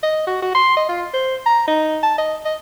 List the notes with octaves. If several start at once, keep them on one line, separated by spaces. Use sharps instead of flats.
D#5
F#4
F#4
C6
D#5
F4
C5
A#5
D#4
A5
D#5
D#5